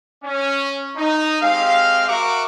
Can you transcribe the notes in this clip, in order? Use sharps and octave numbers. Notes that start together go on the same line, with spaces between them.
C#4
D#4
G#3 C4 G4 F5
F#4 A#4 E5 F#5 C#6 D6